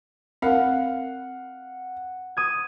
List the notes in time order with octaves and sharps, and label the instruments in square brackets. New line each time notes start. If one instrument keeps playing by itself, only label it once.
[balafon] C4 A#4 [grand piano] F5 [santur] F#5
[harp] D#6 G#6